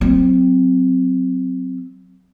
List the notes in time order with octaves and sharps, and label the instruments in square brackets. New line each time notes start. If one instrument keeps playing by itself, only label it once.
[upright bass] F#3 C4